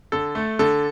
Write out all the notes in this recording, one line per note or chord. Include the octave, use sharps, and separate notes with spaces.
D3 A4
A3
D3 A4